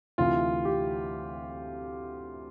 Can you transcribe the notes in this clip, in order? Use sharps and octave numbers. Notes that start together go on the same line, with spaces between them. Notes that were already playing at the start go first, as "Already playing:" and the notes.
D2 C3 E3 F4
G4